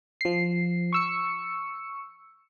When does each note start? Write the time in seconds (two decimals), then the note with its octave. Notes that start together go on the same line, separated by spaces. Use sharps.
0.21 F3 C7
0.93 C#6 E6 C#7